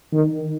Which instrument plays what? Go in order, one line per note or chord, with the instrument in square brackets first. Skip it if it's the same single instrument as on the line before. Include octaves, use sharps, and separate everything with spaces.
[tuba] D#3